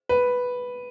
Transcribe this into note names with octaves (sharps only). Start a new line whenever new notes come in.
B4